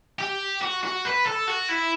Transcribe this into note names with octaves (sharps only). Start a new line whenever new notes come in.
G4
F#4
F#4
B4
A4
F#4
E4